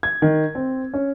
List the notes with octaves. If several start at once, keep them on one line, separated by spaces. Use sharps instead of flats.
G#6
D#3
C4
C#4